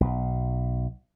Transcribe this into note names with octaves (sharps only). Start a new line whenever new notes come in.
B1